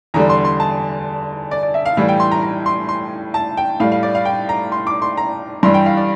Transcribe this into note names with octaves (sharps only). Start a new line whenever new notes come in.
E2 D3 G3 A#5
C6
C6
A5
D5
D5
E5
F5
A2 E3 G3 F5
G5
C6
A#5
A#5
C6
C6
A5
G5
A2 G3 F5
F5
D5
F5
G5
A#5
C6
D6
C6
A#5
G2 E3 G3 C6
G5
F5
D5